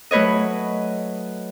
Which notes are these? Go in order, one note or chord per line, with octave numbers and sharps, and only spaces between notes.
F#3 A3 B4 C#5 D#5